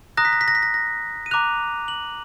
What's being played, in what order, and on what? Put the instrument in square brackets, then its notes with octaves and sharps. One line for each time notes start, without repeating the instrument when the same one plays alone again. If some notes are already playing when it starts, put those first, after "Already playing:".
[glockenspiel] A#5 D#6 F#6 A#6
B6
A#6
B6
A#6
B6
A#6
A#6
D#7
A#5 D6 F#6 F7
F#7